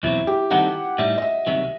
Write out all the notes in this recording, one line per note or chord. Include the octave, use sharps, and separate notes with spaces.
E2 B2 F#3 C4 E4
G4
D#3 G3 C4 D#4 A4 F#5
A2 G3 D#4 E5
D#5
E5
C2 C3 D#3 F#3 E5